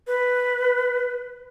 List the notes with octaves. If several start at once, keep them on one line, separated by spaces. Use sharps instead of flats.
B4